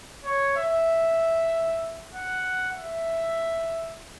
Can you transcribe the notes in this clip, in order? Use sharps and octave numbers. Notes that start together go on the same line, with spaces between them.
C#5
E5
F#5
E5